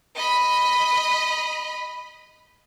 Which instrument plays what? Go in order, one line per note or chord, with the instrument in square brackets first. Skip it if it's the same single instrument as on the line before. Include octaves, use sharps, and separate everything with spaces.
[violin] D#5 B5